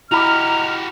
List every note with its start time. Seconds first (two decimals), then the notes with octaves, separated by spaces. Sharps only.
0.12 E4 F#4 G4 D#5 A#5 B5 D6 F6